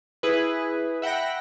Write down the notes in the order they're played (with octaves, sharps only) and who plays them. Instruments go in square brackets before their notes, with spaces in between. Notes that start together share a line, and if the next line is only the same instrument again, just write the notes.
[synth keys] E4 G#4 B4
E5 F#5 G5 B5 A#6